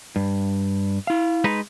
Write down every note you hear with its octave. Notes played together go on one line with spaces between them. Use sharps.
G2
E4 F5
G#3 D#4 B4